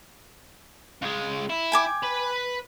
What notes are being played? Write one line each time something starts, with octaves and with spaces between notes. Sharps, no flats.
C#2 G#3
E4
G5 G#5 D6
B4 B5